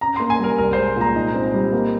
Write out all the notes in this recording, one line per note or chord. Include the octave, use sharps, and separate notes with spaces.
C#4 A#5
A#3 C6
G#5
G3 A#4
C2 A#4
G#3 C5
A#2 A#5
D#4
C4
G3
A#3